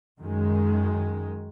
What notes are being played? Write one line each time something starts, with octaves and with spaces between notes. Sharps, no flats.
F#2 D#3 G#3